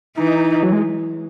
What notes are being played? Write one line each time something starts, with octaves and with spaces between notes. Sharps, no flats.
E3 D#4
F#3
G#3